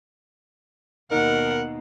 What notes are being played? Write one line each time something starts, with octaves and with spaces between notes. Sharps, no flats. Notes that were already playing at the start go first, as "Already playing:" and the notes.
D#2 B2 D#4 A#4 F#5